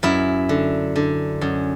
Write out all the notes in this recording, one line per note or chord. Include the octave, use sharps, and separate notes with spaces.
F#2 E4
D3
D3
F#2